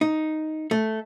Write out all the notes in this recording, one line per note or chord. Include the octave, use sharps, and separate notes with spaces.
D#4
A3